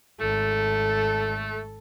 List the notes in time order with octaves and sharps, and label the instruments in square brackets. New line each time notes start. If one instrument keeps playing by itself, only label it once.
[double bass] G#1 [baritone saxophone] A3 [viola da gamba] A4